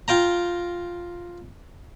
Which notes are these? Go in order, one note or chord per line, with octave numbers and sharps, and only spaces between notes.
F4 G5 A#5